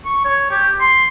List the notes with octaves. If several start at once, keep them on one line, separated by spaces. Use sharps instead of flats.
C#6
C#5
G4
C6